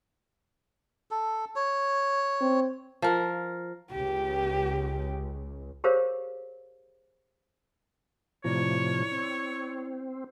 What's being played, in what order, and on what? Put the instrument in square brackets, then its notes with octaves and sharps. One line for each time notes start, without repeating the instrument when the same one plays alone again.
[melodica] A4
C#5
[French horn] C4
[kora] F3 A#4
[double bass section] C#2 [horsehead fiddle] G4
[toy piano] G4 G#4 A#4 C5 C#5 F5
[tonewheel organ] A2 C3 F3 [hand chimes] E4 D5 [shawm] C#5
[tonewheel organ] C4